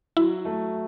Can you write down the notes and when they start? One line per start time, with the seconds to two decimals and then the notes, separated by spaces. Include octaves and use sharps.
0.17 F#3 E4
0.45 A3